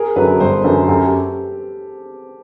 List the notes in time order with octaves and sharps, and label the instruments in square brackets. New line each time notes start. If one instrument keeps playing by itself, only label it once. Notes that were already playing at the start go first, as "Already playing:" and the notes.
Already playing: [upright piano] G#4 A#4
[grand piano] F#2 D3 F#3 [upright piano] A4 B4
[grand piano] G1 [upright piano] A#4 C5
[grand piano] F#2 D3 F#3 [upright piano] A4 B4
[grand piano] F#2 [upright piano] G4 A4
[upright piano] G4 A4